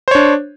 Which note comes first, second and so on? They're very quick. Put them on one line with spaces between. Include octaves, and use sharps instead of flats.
C5 C#5 D4